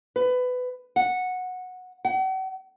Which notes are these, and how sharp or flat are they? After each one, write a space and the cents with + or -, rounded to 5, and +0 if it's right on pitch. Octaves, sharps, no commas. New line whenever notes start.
B4 +20
F#5 -10
F#5 +40